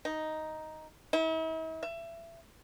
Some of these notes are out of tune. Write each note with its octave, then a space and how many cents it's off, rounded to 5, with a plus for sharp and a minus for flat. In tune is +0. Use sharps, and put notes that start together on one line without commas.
D#4 +5
E4 -45
E5 +25